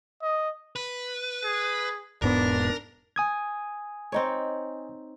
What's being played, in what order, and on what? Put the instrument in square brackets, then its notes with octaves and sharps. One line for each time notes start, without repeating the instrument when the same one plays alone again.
[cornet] D#5
[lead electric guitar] B4
[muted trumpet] G#4
[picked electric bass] E1 G#2 B3 [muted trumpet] D4 [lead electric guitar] A#4
[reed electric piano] G#5 D#6 G#6
[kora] C4 D#4 C#5